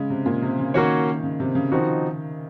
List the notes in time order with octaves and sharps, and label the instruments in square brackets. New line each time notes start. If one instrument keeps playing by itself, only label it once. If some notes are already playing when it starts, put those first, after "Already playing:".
Already playing: [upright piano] C#3 G#3
C3
A#2
C3
C#3
[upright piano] D#3 [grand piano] A#3 C#4 F#4 C#5
[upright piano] C#3
C3
C#3
[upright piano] D#3 [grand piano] F3 C4 D#4 F#4